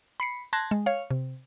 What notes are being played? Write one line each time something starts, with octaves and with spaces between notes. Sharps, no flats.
B5 C7 C#7
A5 C6 F#6 G#6 A#6
G#3
C#5 F5
C3